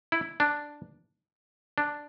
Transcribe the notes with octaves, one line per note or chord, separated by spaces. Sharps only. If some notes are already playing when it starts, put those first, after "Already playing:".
E4
D4
D4